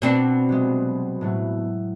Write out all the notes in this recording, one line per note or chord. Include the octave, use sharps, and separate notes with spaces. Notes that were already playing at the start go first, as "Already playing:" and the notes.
B2 C4 D4
C3 F#3 G#3
A2 F#3 A3